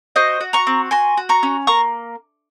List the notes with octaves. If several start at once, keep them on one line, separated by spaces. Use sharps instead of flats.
F#4 C5 D#5
F#4
A#5 C#6
C4
F#4 G#5 C6
F#4
A#5 C#6
C#4
A#3 A#5 C#6